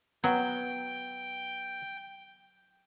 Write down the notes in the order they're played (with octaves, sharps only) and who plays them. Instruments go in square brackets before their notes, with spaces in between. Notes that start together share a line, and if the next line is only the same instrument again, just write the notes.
[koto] F#3 [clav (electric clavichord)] B3 [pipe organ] G5